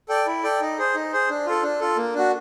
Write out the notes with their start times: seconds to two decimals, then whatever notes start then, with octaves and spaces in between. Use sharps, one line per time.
0.09 A4 D5 G5
0.27 E4
0.43 A4 D5 G5
0.61 D#4
0.78 G#4 C5
0.95 D#4
1.12 G#4 C5
1.29 D4
1.47 F4 A4
1.63 D4
1.80 F4 A4
1.97 A#3
2.14 D4 F#4